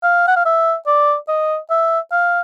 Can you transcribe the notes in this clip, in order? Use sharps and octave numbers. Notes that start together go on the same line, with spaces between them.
F5
F#5
F5
E5
D5
D#5
E5
F5